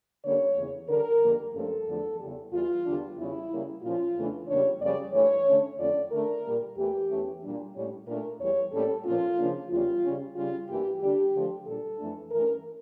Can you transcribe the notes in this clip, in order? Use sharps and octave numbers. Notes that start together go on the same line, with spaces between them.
D3 G3 A#3 C#4 C#5
E2 C#3 E3
D3 G3 D4 A#4
F2 D3 G3 A#3 D4
G2 F3 A3 C#4 A4
E2 D3 F3 A3
E2 C#3 G3
E2 E3 G3 F4
E2 D3 G3 D4
E2 C#3 E3 G3 E4
C#3 G3 A#3
A#2 F3 C#4 F4
E2 C#3 E3 A3 D4
E2 C#3 G3 A#3 D4 C#5
F2 C#3 G3 A#3 D5
G2 E3 A3 C#5
D3 A3 C#4
F2 D3 F3 A3 C#4 D5
D3 A3 D4 A#4
A#2 G3 A#3
E2 E3 A3 G4
E2 E3 A3 C#4
A#2 G3 D4
A2 G3 C#4
A#2 A3 D4 A#4
E2 E3 G3 C#5
A2 G3 A#3 C#4 A4
A#2 F3 A#3 C#4 F4
C#3 F3 A#3 D4
E2 C#3 G3 F4
C#3 G3 C#4
C#3 G3 C#4 F4
G2 E3 A#3 G4
D3 G3 D4 G4
D3 F3 A3
A#2 G3 D4 A4
F2 E3 A3 D4
G2 E3 A3 C#4 A#4